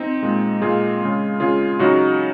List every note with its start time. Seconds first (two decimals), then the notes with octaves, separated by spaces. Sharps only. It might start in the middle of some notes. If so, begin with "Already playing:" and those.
Already playing: C4 D#4
0.22 A#2 G#3
0.62 A#2 G#3 F4 G#4
1.01 C#3 G#3
1.40 C#3 G#3 F4 G#4
1.79 C#3 F#3 D#4 F#4